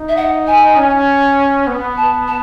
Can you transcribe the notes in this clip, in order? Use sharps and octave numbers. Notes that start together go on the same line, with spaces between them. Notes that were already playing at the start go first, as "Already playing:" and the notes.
Already playing: D#4
E5
F#5
G#5
C#4
B3
A5
A5